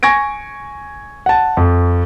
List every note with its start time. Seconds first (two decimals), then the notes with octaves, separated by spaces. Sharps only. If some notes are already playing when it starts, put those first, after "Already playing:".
0.03 G#5 C#6 G#6 A#6 D7
1.26 F#5 A5
1.57 F2